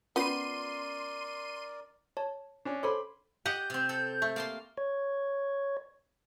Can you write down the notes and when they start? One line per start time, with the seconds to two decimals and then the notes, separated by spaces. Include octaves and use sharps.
0.16 B3 C#4 F4 A#4 D5 B5 C6 D#7
2.17 C#5 A5
2.65 C#4 D4
2.83 A4 C5 C#5 B5 C6 D6
3.45 G4 D#5 F#5 G6
3.70 C3 C4
3.89 A4
4.22 A3
4.36 A#3 A5 C6
4.78 C#5